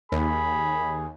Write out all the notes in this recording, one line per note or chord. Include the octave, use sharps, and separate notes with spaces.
D#2 G#4 B5